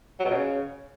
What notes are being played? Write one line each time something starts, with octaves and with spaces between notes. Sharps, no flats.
F#3
B2
C#3